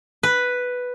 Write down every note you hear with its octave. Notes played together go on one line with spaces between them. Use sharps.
B4